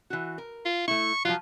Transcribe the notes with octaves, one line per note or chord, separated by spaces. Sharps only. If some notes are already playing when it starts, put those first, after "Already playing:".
E3 F#4
A#4
F4
A3 E4 C#6
F3 F#3 F4